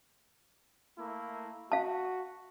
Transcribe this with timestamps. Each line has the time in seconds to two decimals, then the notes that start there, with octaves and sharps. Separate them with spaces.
0.98 A3 A#3 E4
1.72 F#4 F5 A5